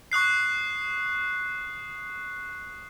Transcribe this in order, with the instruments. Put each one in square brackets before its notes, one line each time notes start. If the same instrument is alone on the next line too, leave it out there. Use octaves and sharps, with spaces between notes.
[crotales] C#6 D#6 F#6 C7